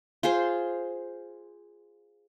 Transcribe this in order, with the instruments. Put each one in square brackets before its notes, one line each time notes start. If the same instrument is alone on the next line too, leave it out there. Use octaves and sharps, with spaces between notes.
[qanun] F4 G#4 C5